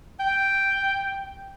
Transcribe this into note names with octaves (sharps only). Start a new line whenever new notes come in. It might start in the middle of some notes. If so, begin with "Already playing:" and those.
G5